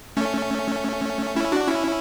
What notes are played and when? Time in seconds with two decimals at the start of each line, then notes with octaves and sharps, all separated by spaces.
0.17 A3 C#4
1.36 C#4 E4
1.52 D4 F#4
1.67 C#4 E4